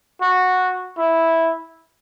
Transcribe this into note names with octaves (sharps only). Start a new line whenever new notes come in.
F#4
E4